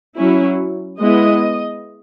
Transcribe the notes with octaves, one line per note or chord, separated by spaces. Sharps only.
F#3 C#4 E4
G#3 B3 E4 D#5